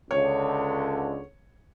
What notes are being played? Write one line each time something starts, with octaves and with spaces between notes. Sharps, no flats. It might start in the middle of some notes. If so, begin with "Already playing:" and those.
C#2 D3 C#5